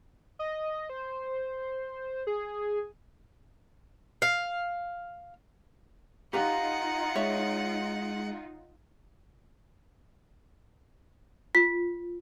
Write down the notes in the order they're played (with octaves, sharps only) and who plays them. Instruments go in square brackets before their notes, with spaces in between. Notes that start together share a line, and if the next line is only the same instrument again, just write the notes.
[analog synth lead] D#5
C5
G#4
[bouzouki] F5
[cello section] D#4 F4 [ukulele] G4 B4 F5 [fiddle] F#5 [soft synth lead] A#5
[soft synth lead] G#3 [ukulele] C#5 E5
[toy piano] F4 [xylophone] B6